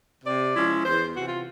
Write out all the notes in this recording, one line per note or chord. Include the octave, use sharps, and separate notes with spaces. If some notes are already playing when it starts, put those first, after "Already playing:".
C3 D5
F3 G#3 C#4 E4
E2 C5
C3 E3 F#4
F4